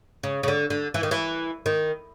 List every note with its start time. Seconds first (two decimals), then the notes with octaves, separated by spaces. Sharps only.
0.23 C#3
0.43 C#3
0.48 D3
0.70 D3
0.94 E3
1.03 D#3
1.11 E3
1.66 D#3